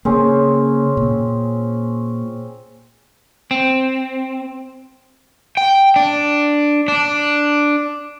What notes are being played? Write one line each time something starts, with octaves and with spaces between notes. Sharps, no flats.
C#3 A#3 C4 C#4 G#4
A#2
C4
G5
D4
D4